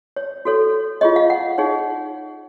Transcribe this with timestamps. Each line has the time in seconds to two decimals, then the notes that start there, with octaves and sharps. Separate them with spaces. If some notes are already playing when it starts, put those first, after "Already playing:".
0.16 C#5
0.45 F#4 A4 C#5
1.01 F4 G#4 C#5 D#5
1.16 F5
1.30 F#5
1.58 D#4 G#4 C#5